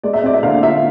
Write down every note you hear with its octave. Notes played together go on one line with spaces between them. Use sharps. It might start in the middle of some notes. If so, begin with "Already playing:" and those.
G#3 D5
E5
C4 D5
E5
D3 F5
F4 E5